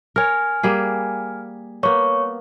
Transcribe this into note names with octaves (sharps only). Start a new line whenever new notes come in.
A#4 C#5 G#5 F6
G3 A#3 G#4
A#3 B3 C#5 C#6